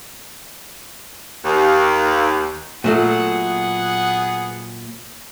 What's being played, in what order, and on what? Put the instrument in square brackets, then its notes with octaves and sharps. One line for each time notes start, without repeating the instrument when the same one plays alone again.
[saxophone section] D#2
[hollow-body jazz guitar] A#2 F#3 A3 [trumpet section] B3 G#4 F#5